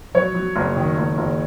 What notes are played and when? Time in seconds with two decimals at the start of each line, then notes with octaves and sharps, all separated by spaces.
0.15 F#3 C#5
0.35 F#3
0.56 F#1
0.76 D#3
0.97 F#1
1.18 F#1